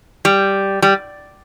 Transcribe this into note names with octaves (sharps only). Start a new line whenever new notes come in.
G3
G3